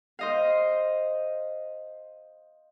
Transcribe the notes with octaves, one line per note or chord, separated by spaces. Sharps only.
C5 D#5 F5